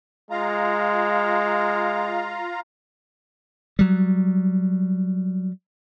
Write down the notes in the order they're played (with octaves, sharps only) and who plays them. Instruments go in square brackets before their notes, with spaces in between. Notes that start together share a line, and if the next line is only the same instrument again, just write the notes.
[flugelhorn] G#3 [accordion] F4 F5 A#5
[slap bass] F#3 G3